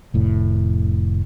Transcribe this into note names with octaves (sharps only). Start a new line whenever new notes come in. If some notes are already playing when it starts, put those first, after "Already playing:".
F1 A2